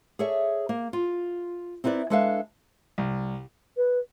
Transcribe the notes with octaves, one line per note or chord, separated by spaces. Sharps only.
G#4 A4 C#5 D5 E5
A#3
F4
C4 D#4 E4 B4 D5
G#3 D4 A4 B4 E5 F5
C2
B4